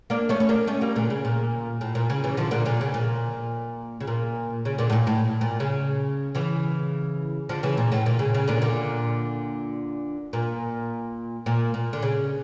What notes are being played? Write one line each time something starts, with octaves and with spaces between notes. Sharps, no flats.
A#3 D4
A3 C#4
C#4
A#3 D4
A3 C#4
G3 A#3
A#2 D3
C#3
A#2
A2
A#2
C#3
C#3 E3
D3 F3
A#2 D3
A#2 D3
C#3
A#2
C#3
A#2
C#3
A#2 D3
A2
A#2
A2
A#2
C#3
C#3 E3
D3 F3
C#3 E3
A#2
A2
A#2
C#3
C#3
A#2 D3
A#2 D3
A#2
A#2
A#2
D3
C#3